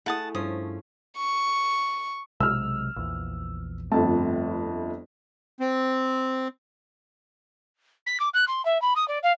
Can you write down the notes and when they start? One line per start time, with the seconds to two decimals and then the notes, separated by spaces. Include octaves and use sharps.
0.06 A3 E4 G#4 F#5 A5 D#6
0.35 G2 F3 C#4 D#6
1.18 C#6
2.40 B1 C3 G#3 E6 F6
2.96 A#1 E2
3.92 G1 F2 A3 C4 A5
5.60 C4
8.06 B6
8.20 D6
8.34 F#6
8.47 C6
8.65 E5
8.81 B5
8.96 D#6
9.08 D5
9.23 F5